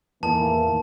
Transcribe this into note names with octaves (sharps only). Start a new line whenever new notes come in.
E2 A2 D#3 E3 A#3 A5